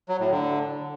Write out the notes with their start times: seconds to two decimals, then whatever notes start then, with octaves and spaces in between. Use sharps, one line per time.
0.09 F#3
0.20 A2
0.31 D3